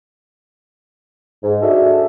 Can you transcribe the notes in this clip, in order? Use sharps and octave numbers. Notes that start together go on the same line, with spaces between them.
G#2
D4 F#4 G#4 A4 E5